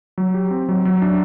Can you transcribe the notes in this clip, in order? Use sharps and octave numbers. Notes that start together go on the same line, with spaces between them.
F#3
G4
C4
F#3
F#3
D4